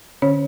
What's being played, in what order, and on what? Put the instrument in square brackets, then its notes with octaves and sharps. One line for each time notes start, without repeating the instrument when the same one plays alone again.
[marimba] D3 C#4 C#5